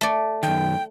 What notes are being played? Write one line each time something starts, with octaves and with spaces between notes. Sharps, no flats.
A3 D5
F#2 D#3 G5